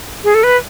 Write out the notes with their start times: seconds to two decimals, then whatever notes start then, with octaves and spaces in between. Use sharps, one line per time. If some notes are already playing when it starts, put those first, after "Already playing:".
0.24 G#4
0.35 A4
0.43 B4